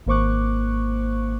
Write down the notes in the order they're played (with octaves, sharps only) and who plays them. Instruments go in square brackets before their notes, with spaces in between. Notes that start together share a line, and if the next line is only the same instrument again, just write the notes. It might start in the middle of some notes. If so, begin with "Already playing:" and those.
[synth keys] G#1 A#3 C5 C#6 D6 F#6